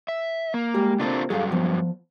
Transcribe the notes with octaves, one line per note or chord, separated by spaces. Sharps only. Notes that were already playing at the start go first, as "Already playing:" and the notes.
E5
A#3
G3 G#3 G4
C3 A#3 C4 D4 F4 A4
G2 F#3 G#4 A4 F5
F3 B3